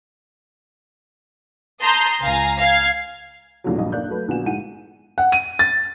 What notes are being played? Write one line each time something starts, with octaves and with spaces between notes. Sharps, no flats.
A5 A#5 C6 D#6 G6
C#2 F5 G#5 A#5
F5 G#6
A#1 E2 A2 C3 F#3
A#1 G2 D#5
A#3 D4 F#6 G6
F#3 A3 B4
A#1 B3 F#4 G#5 E7
G#2 E4 F#5 D#7
F#5
D#7
A6